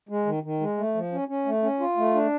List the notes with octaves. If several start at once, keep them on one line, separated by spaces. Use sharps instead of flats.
G#3
D#3
D#3
G#3
A3
F3
C#4
C#4
A3
C#4
F4
A3
D4